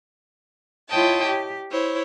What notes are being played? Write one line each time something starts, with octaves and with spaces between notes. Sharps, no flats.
E4 F4 C#5 D#5 G5 A5
G4
E4 C5 C#5